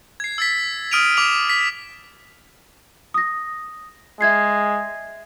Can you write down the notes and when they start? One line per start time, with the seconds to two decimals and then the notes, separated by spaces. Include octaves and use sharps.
0.20 G#6 C7
0.38 E6 A6 B6
0.91 D#6 F6 D7 D#7 F7
1.17 D6 D#6 F7
1.49 B6
3.14 D#6 A#6
4.21 G#3 E5 G#6 C7